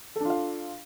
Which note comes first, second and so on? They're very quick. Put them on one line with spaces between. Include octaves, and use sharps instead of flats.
A4 D4 F4 F5